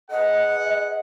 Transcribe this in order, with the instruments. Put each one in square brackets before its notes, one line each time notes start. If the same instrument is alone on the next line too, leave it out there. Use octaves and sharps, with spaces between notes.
[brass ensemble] G#4 B4 F#5 [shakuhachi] D#5